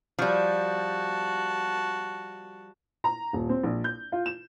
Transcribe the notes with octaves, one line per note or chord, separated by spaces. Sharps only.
F3 G3 F#4 A5
A#5
D#1
C4
A#1
G6
F4
E7